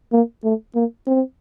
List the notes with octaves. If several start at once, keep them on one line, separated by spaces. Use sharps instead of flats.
A#3
A3
A#3
C4